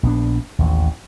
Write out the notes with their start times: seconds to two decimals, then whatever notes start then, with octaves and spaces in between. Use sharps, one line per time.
0.03 A#1 B3 D4
0.59 A1 D#2